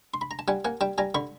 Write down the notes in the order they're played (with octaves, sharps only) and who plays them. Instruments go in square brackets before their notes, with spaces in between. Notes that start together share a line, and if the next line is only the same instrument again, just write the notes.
[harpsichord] C6
B5
A#5
A5
G3 F#5 G#5
A#3 F#5 G#5
G3 G5 A5
G3 G#5 A#5
D3 B5 C#6